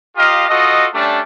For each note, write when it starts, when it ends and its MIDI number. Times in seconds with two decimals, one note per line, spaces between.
0.16 0.45 65
0.16 0.45 67
0.16 0.45 70
0.16 0.45 75
0.16 0.45 77
0.48 0.87 65
0.48 0.87 66
0.48 0.87 69
0.48 0.87 75
0.94 1.20 55
0.94 1.20 57
0.94 1.20 61
0.94 1.20 62
0.94 1.20 67